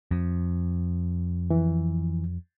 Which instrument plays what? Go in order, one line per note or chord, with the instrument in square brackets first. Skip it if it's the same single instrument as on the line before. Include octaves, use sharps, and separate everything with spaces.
[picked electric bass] F2
[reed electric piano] E3